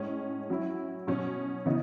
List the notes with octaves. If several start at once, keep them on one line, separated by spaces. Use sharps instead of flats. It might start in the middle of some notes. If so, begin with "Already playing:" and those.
Already playing: A2 G#3 C#4
F#3 C#4 E4
B2 F#3 C#4
C#3 E3 B3 D#4